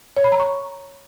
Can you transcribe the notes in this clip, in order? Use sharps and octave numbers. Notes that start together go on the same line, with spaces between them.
C#5
B5
A#5
C#6